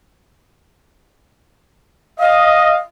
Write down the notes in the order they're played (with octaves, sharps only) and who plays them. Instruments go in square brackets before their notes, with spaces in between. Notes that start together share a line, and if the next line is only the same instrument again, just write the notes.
[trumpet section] D#5 [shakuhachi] F5